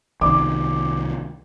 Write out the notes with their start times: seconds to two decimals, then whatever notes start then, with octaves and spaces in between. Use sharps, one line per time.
0.21 C2 D#3 D6